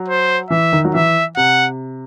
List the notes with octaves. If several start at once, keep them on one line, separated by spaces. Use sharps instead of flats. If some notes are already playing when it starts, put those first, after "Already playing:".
Already playing: F#3
C5
E3 E5
D#3
F#3
E3 E5
C3 F#5